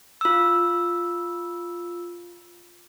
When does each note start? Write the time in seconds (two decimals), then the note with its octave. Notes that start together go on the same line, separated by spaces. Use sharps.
0.21 F4 E6